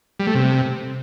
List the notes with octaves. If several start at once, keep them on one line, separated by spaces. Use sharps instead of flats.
G3
A3
C3